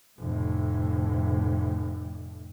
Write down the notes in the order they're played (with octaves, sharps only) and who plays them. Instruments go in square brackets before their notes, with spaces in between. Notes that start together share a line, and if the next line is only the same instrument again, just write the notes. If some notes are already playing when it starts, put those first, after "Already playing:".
[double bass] F1 A2